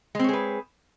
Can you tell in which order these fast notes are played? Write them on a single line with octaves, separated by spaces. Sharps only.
G#3 C4 C#5 G#4 B4